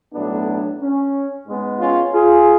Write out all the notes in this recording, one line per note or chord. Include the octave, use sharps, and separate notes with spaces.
B1 A2 F#3 A3 B3 D4
C#4
G#2 G#3 B3
C#4 F4
F4 G#4